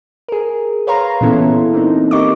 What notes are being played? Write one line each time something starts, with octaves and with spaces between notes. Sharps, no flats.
G#4 A#4
B4 C#5 F5 A#5 C6
A#2 E3 B3 C#4 E4 A4
A#3 C4 D4 D#4
G4 A#4 D#5 C#6 D6